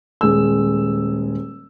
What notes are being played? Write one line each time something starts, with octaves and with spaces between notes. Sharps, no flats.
D#1 G#3 G#4 E6